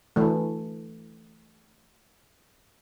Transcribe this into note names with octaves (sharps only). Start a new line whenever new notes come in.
E3 A3